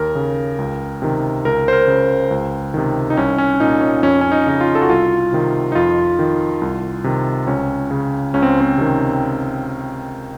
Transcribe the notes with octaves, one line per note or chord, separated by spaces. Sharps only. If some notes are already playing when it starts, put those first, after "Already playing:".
Already playing: D#2 A#4
C#3
C#2
C3 D#3
C#2 A#4
C5
A#4
C#3
C#2
C3 D#3
D#4
C2 C#4
C#4
A#2 D#4
C#4
F2 C#4
C#4
D#4
C#3 D#4
F4
A4
F#4
C2 F4
C3 D#3
D#4
F2 F4
D#3
C2
C3 D#3
C#2 C#4
C#3
C#2 C#4
C4
C4
C3 D#3